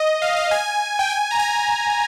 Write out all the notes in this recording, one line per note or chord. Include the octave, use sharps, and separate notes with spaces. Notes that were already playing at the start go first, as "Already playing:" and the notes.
Already playing: D#5
F5
F5
G#5
G5
G#5
A#5
G#5